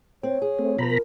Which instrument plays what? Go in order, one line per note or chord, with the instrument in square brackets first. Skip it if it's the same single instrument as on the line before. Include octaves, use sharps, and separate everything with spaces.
[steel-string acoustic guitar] C4 [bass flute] C#5
[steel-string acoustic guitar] G#4
[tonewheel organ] A3 C4
[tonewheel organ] B2 A#5 B5 [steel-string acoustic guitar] F3 B4
[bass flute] A#4